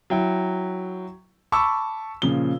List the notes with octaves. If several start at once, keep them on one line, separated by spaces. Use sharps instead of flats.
F#3 E4 G5
A5 B5 C#6 D6 E6
A#2 C#3 F3 G7